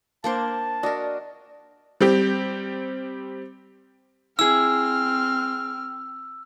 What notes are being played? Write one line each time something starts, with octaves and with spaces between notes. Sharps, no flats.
A#3 D4 C5 A5
D4 F#4 A#4 D#5
G3 C4 G4
C4 E4 G#4 E6 F6